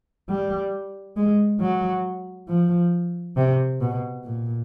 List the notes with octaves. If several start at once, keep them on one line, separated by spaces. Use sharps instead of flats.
G3
G#3
F#3
F3
C3
B2
A#2